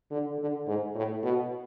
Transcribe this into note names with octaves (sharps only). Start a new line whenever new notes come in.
D3
D3
G#2
A2
B2